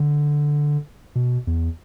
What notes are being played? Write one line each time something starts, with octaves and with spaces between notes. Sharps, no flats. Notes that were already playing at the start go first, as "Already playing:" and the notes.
Already playing: D3
B2
E2